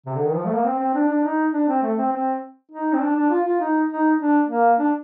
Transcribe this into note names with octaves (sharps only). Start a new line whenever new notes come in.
C3
D3
D#3
F3
A3
A#3
C4
C4
D4
D4
D#4
D4
C4
A3
C4
C4
D#4
C4
D4
D4
F4
F4
D#4
D#4
D4
A#3
D4